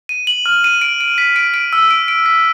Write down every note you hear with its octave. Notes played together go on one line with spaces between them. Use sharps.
D#7
F#7
F6
D#7
D7
D7
B6
D7
D7
E6
D7
D7
B6